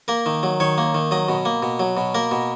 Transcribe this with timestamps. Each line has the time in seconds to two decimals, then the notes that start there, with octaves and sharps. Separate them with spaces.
0.08 A#3 A#4
0.26 D#3
0.43 F#3
0.60 D#3 C#5
0.78 A#3
0.94 D#3
1.11 F#3 D#5
1.29 B2
1.45 A#3
1.63 B2
1.80 F#3
1.97 B2
2.15 A#3 A#4
2.31 B2